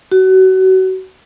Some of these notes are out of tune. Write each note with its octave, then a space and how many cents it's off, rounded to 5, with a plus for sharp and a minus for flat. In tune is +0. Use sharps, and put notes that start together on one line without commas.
F#4 +30